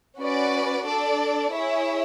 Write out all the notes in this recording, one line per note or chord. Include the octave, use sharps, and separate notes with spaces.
C#4 F#4 B4 D5
D4 A4 D5
E4 G#4 C#5 E5